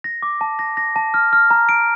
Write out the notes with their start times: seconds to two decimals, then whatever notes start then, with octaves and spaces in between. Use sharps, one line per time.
0.04 A#6
0.22 D6
0.41 A5
0.59 A#6
0.77 A#6
0.96 A5
1.14 F6
1.33 F6
1.51 A#5
1.69 D7